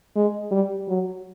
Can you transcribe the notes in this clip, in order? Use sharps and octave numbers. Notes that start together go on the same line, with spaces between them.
G#3
G3
F#3